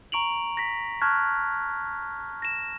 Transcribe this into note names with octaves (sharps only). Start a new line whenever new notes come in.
A#5 C#6 D7 F7 F#7
A#6 B6
A5 C#6 F6 F#6 G#6
A#6 E7